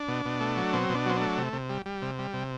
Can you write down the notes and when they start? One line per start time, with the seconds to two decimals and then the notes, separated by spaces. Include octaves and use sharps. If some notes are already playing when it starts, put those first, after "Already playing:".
Already playing: D4
0.08 B2
0.25 B2
0.40 A3
0.57 F#3
0.73 B2 C4
0.90 B2 D4
1.06 F#3 C4
1.17 A3 D4
1.38 C3
1.53 C3
1.70 G3
1.86 G3
2.02 C3
2.19 G3
2.34 C3